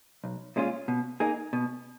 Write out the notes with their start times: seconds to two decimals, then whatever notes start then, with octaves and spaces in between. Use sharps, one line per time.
0.24 B1
0.56 A#2 G#3 C#4 F4
0.88 B2
1.20 A#3 D#4 G#4
1.53 B2